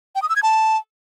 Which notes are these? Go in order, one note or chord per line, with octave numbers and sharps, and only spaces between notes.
G5
D#6
E6
G#6
A5